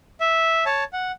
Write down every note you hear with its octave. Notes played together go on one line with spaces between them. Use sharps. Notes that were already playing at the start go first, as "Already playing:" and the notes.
E5
C#5 A5
F#5